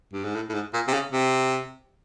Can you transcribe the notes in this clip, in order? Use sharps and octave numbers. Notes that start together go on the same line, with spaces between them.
G2
G#2
A2
A2
G#2
A#2
C3
C#3
C3